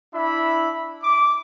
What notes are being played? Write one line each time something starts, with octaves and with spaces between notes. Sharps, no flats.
D4 E4 E5 B5
D6